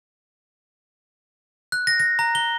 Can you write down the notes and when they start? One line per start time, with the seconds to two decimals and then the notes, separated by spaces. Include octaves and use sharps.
1.72 F#6
1.87 A#6
2.00 A#6
2.19 A#5
2.35 G7